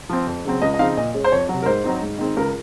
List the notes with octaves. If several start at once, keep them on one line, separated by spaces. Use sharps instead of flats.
F3 C4
F2
C#3 F#3 C4
C#2 D#5
D#5
C#3 F3 C4 D#4 F5
A#2 D#5
G#3 C#4
C5
F2 C#5
C3 F#3
A#4
G#2 C5
F#3 C4 D#4
G#2
D#3 G#3 C4
C#2 A#4